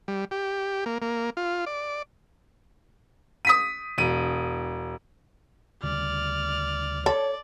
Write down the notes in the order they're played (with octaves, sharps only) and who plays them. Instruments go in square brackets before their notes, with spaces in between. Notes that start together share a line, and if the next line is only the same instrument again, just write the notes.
[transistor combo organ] G3
G4
A#3
A#3
F4
D5
[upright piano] D#6 B6 D#7
E1 D#7
[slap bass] D2 C#3 G3 [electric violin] D5 F6
[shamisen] A4 [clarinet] C#5 [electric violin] D5